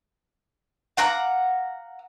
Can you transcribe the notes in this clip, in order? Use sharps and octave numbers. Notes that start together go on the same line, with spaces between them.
F5 F#5 A#5 D6